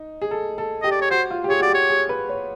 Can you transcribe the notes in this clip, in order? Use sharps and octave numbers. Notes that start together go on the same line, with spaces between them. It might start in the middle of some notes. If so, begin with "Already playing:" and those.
Already playing: D#4
G#4
A4
A4
G4 D#5
D5
C#5
F#4 C5
F4
G4
G#4 C#5
F#4 D5
G4 C#5
G#4
B4
C#5